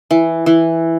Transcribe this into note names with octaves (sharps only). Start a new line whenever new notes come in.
E3
E3